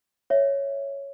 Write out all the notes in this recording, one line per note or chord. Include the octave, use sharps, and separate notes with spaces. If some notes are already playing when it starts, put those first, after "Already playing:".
C#5 E5